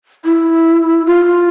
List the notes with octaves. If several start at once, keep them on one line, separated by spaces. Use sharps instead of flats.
E4
F4